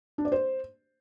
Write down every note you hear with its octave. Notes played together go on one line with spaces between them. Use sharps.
D4
D5
C5